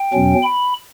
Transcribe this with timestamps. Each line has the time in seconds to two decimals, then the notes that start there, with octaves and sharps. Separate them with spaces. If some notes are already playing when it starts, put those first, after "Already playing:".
Already playing: G5
0.14 E2 B2 F#3 C#4
0.43 B5